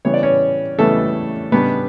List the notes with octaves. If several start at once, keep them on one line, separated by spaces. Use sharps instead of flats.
C#3 E3 G3 B3 C#5
D5
C#4 C#5
C#3 E3 G3 A3 B3 A4
C#3 G3 B3 D4 B4